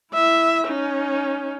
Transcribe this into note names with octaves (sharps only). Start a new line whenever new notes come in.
E4 E5
C#4 D#4